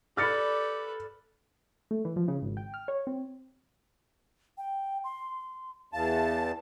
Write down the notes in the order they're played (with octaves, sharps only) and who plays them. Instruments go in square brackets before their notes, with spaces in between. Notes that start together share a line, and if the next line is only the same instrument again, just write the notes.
[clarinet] G4 [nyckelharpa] A4 B4 [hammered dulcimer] D5 B5 [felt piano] F6 A6 C#7
[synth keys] A3
E3
F3
C#3
G#1
G5
F6
C#5
C4
[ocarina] G5
C6
[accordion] E2 A5 [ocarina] F5